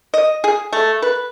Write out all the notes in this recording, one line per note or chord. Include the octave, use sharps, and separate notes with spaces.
D#5
G#4
A3
B4